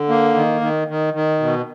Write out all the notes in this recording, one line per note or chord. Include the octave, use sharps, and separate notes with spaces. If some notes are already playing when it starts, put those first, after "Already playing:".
Already playing: D3
A#3
D#3
D#3
D#3
D#3
B2